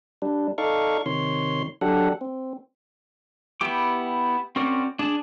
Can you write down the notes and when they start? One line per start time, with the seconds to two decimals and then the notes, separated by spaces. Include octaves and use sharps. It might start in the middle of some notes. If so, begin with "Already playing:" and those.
0.22 G3 D4
0.58 D#4 A4 D5 F5 C#6
1.06 C3 D#3 C#5 C6
1.81 F#3 D4 G4 A4 F#5
2.21 C4
3.61 B3 E4 G4 D6
4.56 C4 C#4 F#4 A#4 D5
4.99 D4 G#4 A5